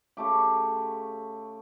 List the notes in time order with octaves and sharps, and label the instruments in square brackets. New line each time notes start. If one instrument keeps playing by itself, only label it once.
[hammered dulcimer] C#3 A3 G4